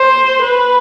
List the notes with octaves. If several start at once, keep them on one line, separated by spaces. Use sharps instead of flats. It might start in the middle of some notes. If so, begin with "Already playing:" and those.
Already playing: C5
B4